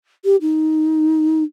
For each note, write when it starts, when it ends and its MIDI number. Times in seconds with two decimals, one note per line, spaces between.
0.24 0.36 67
0.41 1.43 63